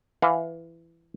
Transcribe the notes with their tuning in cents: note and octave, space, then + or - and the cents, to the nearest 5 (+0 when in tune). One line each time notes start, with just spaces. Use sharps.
E3 +15 F5 +25